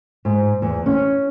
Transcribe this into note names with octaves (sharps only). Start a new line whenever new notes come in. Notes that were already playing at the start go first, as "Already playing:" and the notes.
G#2
E2
C#4